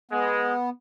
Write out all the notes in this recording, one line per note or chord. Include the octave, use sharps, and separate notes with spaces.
G#3 B3